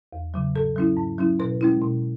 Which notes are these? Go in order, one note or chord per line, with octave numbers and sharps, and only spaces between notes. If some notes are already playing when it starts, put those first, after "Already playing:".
E2
C#3 F#3
G#2 A4
F#3 C#4 E4
G#2
F#3 C#4 E4
B2 B4
G#3 C#4 E4
B2